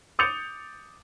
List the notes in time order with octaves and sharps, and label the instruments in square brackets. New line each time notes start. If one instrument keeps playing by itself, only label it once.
[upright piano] D6 D#6 G6 A6 C#7 F7